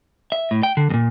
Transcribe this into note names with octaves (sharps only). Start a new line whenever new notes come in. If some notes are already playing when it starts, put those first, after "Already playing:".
E5
A2
G5
D3
E2 A#2